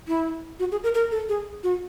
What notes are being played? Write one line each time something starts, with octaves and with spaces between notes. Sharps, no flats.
E4
F#4
G#4
A#4
A#4
A4
G#4
F#4